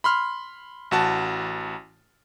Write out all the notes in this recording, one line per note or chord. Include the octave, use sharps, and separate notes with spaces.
B5 C6 F6
A1 F#4 A5